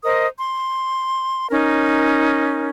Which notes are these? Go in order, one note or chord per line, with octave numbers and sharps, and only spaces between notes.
A#4 C5 D#5 D#6
C6
C#4 D#4 A#4